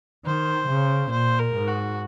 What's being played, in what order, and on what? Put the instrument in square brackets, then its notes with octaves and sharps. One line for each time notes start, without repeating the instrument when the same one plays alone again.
[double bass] D#3 [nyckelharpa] C5
[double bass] C#3
[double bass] A#2 [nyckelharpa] C5
[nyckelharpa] A#4
[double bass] G#2
[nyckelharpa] F#4